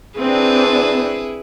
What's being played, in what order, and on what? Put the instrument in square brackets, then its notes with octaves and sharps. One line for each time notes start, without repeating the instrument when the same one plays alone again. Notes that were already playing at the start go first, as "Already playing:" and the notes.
[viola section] C4 D4 [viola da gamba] E4 G#4 B4